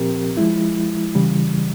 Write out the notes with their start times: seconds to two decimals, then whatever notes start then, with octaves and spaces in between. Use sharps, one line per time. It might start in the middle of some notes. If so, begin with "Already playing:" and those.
Already playing: A#2 F3 C4 G4 A#4
0.37 F3 G#3 E4
1.15 C#3 E3 G3